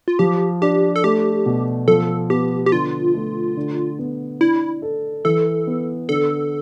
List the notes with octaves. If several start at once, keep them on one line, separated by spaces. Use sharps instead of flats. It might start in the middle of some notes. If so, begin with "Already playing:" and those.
F4
F3 G4
D4 G4
A4
A3 G4
B2
F3 A4
B3 G4
G4
D3 F4
A3
D3
B3
D4 E4
A4
E3 A4
B3
D3 A4